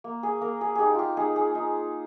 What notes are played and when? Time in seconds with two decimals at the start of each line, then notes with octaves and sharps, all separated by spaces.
0.04 A#3
0.23 G#4
0.41 A#3 A#4
0.61 G#4
0.75 D#4 G4 G#4
0.94 F4 G4
1.17 D#4 G#4
1.36 G#4
1.55 D#4